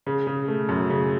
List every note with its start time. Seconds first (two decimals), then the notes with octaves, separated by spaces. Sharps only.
0.07 C#3
0.27 C#3
0.48 A3
0.69 F#2
0.90 C#3